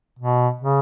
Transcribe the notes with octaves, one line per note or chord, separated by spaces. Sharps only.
B2
C#3